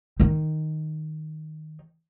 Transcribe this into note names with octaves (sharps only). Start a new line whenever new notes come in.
D#3 D#4